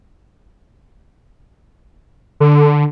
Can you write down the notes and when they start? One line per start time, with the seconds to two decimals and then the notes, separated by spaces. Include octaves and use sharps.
2.40 D3